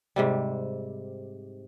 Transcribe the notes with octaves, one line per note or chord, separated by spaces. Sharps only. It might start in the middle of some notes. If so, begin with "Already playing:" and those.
G#2 C3 G3